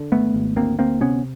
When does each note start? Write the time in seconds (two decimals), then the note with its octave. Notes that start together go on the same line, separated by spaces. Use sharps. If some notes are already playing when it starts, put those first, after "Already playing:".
Already playing: D3
0.12 G#1 A3 B3
0.34 G#1
0.56 D2 A#3 C4
0.79 D2 A#3 C4
1.01 C3 B3 C#4